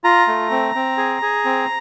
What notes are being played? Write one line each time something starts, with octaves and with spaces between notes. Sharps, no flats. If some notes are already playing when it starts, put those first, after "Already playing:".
F4 A#5
A3
C4
C4
G#4
G#4
C4